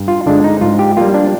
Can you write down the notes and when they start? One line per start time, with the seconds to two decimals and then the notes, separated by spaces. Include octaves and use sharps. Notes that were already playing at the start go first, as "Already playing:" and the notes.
Already playing: G2
0.08 F4
0.26 D3 G#3 D4
0.44 D#4
0.61 G#2 F4
0.79 G4
0.97 G3 A#3 F4
1.14 D4